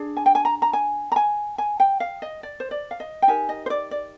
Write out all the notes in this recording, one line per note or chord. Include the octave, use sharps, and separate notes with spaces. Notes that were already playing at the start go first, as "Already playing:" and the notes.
Already playing: D4 G#4
G#5
G5
G#5
A#5
A#5
G#5
A#5
G#5
G#5
G5
F5
D#5
D5
C5
D5
F5
D#5
G5
D#4 G4 A#4 G#5
D#5
C5
D5
D5